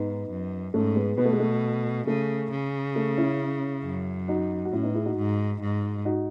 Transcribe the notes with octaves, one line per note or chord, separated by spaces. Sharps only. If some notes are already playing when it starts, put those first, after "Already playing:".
Already playing: G#2 B3 D#4
F#2
G#2 A3 C#4
G#3 B3
B2 B3
A3
G#3
A3
C#3 A3
C#3
A3
C#4 E4
F#2
D#4 F#4
F#4
A2 C#4 E4
B3 D#4
E4 G#4
D#4 F#4
G#2
G#2
D#4 F#4